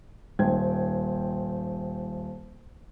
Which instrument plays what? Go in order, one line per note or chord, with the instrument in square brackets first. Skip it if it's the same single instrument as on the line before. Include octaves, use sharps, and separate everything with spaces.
[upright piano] D#1 C5 G5 G#6